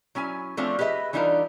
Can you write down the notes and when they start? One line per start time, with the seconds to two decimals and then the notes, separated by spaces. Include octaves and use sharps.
0.15 F#3 C#4 E4 G#5
0.57 F3 A3 C4 D4 F4 C#5
0.79 G4 G#4 B4 D#5 E5
1.13 E3 G3 D4 D#4 F4 A#4